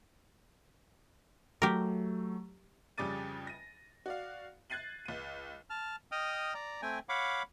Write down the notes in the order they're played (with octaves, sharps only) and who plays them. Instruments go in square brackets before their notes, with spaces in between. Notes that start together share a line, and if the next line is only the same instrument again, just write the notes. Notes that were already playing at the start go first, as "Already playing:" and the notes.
[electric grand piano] F#3 A3 [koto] G4 A#4
[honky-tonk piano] F2 C#3 G3 D6 A6 D#7
A#6 D#7
F#4 D5 F5
F#6 G#6 A6 C7 D#7 F#7
C#2 D#7
[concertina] A5 F6
D#5 G5 D#6 F6
D5 A#5
A3 C4 G5 G#5
C#5 F5 F#5 B5 D6